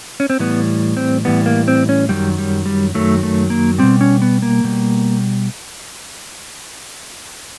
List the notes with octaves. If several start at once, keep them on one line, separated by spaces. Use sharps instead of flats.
C#4
C4
A2 E3 G3 B3
C4
A2 E3 G3 B3
A#3
C4
C#4
F#2 D#3 F#3 G3
G3
G3
F#2 D#3 F#3 A3
A3
A#3
B2 G3 C4
C#4
B3
A#3
B2 G3